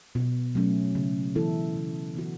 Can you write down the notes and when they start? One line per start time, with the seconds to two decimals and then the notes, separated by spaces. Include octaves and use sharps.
0.15 B2
0.55 F#3 A3 C#4
0.95 C#3
1.35 E3 B3 E4 A4
1.76 C#3
2.15 E3 B3 F#4